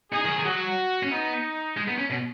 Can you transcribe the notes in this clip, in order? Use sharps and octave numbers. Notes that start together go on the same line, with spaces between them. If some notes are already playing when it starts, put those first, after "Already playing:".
D#4 G#4
D#3
F#3
D#3
F#3 F#4
C#4
B3 D#4
G#3
B3
C#4
B2